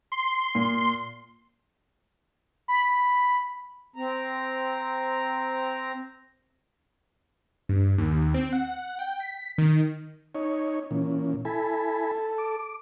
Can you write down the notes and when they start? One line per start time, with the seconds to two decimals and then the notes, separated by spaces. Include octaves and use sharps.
0.12 C6
0.55 A#2
2.68 B5
3.96 C4 A#5
7.69 G2
7.98 D#2
8.34 C4
8.53 F#5
8.99 G5
9.20 B6
9.58 D#3
10.35 D#4 C#5
10.91 A#2 E3 C#4
11.45 E4 A4 G#5 B5
12.38 D6